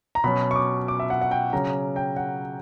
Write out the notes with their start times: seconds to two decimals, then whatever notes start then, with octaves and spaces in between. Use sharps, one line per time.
0.15 A#5
0.24 B2 F#3 C#4 B5
0.51 C#6
0.56 D6
0.88 D6
0.99 E5
1.10 F#5
1.21 F#5
1.31 G5
1.53 C#3 F#3 C#4 A#5
1.96 G5
2.17 F#5